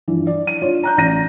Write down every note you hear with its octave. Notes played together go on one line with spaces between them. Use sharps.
G2 E3 F3
D5
D#7
D4 F4 C#5
A#5 F#6 G6
A1 D5 A#6 D#7